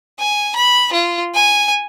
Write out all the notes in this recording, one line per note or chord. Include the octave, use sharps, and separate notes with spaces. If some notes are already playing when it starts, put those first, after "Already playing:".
G#5
B5
F4
G#5